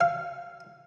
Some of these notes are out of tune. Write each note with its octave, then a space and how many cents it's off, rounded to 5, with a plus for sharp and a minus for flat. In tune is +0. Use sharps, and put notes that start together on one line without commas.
F5 -15